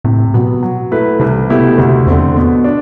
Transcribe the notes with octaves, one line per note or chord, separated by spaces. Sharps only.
A2 C3
B2 F#3 B3
F#3
A3 E4 B4
C2 C3
B2 A3 E4 G4
D2 C3
E2 D3 A3 C4
B2
D4